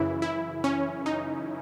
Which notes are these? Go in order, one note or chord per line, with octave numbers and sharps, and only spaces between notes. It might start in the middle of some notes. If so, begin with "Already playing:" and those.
Already playing: F#2 C#3 E3 E4
E4
C#4
D#4